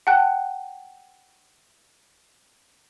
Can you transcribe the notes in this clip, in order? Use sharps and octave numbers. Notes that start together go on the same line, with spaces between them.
F#5 G5 A5 F#6